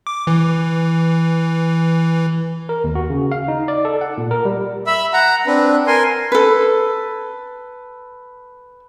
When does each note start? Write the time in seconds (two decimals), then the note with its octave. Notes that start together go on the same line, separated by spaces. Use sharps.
0.07 D6
0.27 E3
2.69 A#4
2.84 D#2
2.95 F#4
3.10 C#3
3.32 F5
3.48 D#4
3.68 D5
3.85 A4
4.01 F#5
4.18 A#2
4.31 A#4
4.45 G3
4.87 E5 B5 E6
5.13 F#5 A#5
5.46 C4 D4 B4
5.87 A#4 G#5 C6
6.32 A4 B4